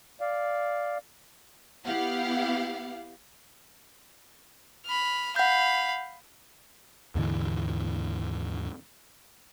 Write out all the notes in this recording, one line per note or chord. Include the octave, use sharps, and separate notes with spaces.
D5 F5
B3 E4 G4 F5 F#5
B5 F6
F5 F#5 B5 G6
D#2 G#2 D3 E3